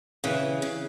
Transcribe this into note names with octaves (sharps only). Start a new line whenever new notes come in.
C#3 E3
C#3